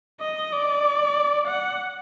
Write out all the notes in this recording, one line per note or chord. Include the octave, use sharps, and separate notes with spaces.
D#5
D5
F#5